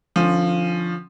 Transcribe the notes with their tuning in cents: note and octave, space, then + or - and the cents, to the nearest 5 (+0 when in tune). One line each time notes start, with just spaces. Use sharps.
D3 +25 F3 +0 C#4 +0